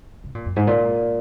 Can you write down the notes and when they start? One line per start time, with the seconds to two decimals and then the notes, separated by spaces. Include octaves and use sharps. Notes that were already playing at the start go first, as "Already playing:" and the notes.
0.24 C3
0.35 A#2
0.46 F#2
0.56 G#2
0.67 A#2